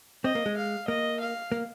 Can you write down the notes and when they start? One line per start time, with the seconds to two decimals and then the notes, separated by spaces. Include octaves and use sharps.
0.24 C4 D#5
0.35 A#3
0.46 G#3
0.57 F5
0.88 A#3 D#5
1.20 F5
1.52 A#3